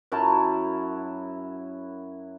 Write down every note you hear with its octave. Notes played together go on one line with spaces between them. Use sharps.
F#2 F#3 E4 A5